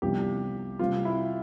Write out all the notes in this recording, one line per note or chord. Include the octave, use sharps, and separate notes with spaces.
C2 C3 F3 B3 D4 G4
C3 G3 C4 F4
E4